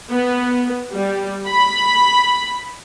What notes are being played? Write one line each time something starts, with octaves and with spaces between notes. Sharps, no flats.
B3
G3
B5